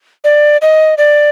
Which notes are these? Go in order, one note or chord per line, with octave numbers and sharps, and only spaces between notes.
D5
D#5
D5